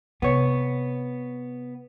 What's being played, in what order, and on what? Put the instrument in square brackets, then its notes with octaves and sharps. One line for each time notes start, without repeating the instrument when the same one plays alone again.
[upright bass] C3 [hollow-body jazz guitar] B3 C#5